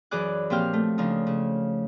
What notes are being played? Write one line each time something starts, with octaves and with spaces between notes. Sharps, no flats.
F#2 E3 G#4 D5 D6 F#6
A#2 F3 C4 G4 G5 F6
A3
C#3 F3 D4 D#4
C#3